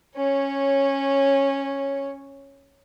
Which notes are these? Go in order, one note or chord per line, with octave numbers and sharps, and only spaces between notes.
C#4 C#5